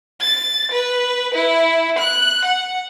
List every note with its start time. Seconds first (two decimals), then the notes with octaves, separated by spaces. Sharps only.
0.21 A6
0.72 B4
1.34 E4
1.99 F#6
2.45 F#5